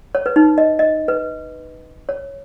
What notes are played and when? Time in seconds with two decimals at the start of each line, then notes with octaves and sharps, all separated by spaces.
0.15 C#5
0.26 B4
0.36 D#4
0.58 D#5
0.79 D#5
1.08 B4
2.09 C#5